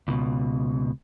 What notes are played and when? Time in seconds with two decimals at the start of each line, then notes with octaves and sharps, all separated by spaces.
0.08 C#2 B2